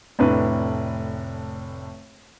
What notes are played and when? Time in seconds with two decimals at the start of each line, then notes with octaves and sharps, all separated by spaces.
0.19 F1 A2 D4 B4